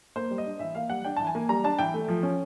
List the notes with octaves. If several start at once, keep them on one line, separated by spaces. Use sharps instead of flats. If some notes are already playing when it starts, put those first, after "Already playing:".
A#3 C5
G3
D#5
D4
E3 E5
A#3 F5
G3 F#5
D4 G5
E3 A5
G#5
A#3
G3 A#5
D4 A5
E3 G5
A3
F3
C#4